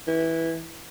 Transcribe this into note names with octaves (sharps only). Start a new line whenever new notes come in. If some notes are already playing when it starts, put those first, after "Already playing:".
E3